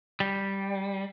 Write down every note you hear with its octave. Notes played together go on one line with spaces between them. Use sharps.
G3